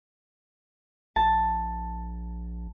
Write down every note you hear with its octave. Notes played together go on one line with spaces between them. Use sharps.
A#1 A5